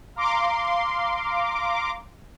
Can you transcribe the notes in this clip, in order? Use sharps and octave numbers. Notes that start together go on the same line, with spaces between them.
F5 A#5 C6 D6